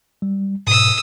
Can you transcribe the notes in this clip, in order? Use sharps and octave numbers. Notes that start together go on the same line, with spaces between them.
G3
G#2 B2 D#6 E6